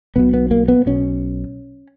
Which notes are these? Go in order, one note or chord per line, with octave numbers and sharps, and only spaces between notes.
B1 B2 B3
B3
A#3
B3
B1 B2 C#4